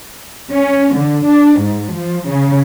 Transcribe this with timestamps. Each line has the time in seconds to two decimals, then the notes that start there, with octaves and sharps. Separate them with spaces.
0.52 C#4
0.97 D3
1.27 D4
1.62 G#2
1.94 F3
2.30 C#3